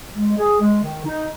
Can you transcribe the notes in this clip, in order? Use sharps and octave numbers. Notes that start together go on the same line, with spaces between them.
G#3
G#4
G#3
D#3
D#4